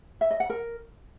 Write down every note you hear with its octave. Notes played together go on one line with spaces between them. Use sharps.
E5
D#5
F#5
A#4